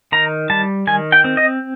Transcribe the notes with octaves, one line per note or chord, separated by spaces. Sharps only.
D#3 A#5
G3 A5
D#3 G#5
G5
C4
D#5